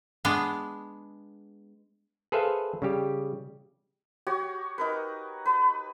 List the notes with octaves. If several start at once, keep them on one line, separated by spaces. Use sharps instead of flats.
G#3 B3 D4
G#4 A4 B4 C5 E5 F5
C#3 G3 G4
F#4 G4 C#5
D#4 A#4 B4
B4